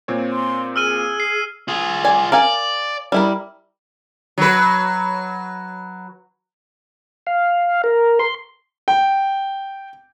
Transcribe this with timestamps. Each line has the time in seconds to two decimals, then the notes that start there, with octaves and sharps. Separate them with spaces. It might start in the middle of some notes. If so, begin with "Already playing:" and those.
0.08 A#2 C4 C#5
0.32 C6
0.76 G#4 E6 F6 D#7
1.20 C7
1.68 F4 G#4
2.04 D5 G#5
2.32 A#4 D5 F5 G#5
3.12 G3 E4 A#4
4.38 F#3 B4
7.27 F5
7.84 A#4
8.19 C6
8.88 G5